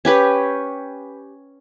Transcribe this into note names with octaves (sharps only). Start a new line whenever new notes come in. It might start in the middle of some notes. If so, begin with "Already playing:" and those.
C#4 G4 B4 C#5